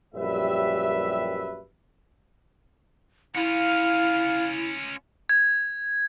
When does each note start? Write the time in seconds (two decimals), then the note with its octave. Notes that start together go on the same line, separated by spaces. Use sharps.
0.15 A#1 F#2 G3 G4 B4 E5
3.35 C#4 E4 F4 F5
5.29 G#6